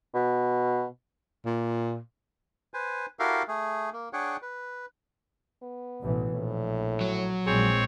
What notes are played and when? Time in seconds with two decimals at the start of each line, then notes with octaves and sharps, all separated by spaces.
0.14 B2
1.45 A#2
2.74 B4 C5 G#5
3.19 E4 F#4 G4 A4 A#4 F5
3.48 A3 G#4
3.93 A#3
4.13 D4 G#4 C#5 F#5 G5
4.42 B4
5.62 B3
6.02 A1 B2 E3
6.34 A#1 A2
7.01 F#3
7.46 A#1 A#2 G#3 C4 G#4 C#5